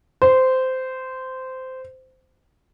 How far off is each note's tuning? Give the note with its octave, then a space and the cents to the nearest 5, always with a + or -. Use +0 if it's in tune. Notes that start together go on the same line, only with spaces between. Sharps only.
C5 -15